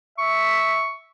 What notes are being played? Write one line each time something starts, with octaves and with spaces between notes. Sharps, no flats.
E5 C#6